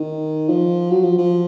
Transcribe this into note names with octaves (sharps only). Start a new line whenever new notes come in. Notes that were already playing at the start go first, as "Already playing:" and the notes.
Already playing: D#3
F3
F#3
F3
F3